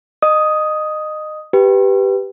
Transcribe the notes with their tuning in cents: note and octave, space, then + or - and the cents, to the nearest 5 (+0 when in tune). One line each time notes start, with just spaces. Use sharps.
D#5 -20 D#6 +5
G4 +0 B4 +0